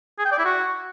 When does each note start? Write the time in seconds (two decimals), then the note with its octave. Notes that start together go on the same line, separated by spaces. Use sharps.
0.19 G#4
0.25 G5
0.32 D5
0.39 E4
0.45 F#4